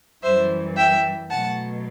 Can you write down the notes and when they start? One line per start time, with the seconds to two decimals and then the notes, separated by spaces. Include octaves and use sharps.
0.23 F#2 E3 G3 C5 E5
0.76 E5 G5
1.30 B2 F#3 A3 F#5 A5